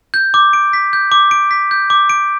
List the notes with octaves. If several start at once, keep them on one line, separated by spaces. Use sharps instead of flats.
G6
D6
D7
B6
G6
D6
D7
B6
G6
D6
D7